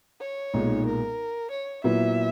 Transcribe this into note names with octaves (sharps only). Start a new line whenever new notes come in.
C#5
B1 A#2 G#3 D#4
A#4
C#5
A#2 F#3 B3 E4 E5